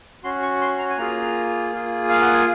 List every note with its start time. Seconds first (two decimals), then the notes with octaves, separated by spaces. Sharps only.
0.23 C#4 F#4 C6
0.42 C#6
0.61 C6
0.79 A#5
0.90 G#5
0.98 A#3 F4 G#4 A#5
1.72 A#3 F4 G#4
2.10 F5
2.22 F#5
2.34 G#5